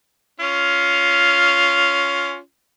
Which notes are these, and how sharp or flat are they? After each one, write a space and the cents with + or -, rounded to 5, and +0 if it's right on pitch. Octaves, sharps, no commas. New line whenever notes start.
C#4 +15 F4 +0